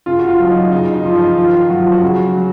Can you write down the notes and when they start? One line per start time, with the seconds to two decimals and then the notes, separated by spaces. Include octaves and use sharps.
0.06 C#3 F4
0.19 F#4
0.28 F4
0.40 F#3
0.50 D#4
0.71 C#3 D#4
0.94 D#4
1.05 F3 F4
1.15 D#4
1.37 D#3 F4
1.70 F#3 F#4
1.81 F4
1.92 F#4
2.02 C#3
2.35 F#3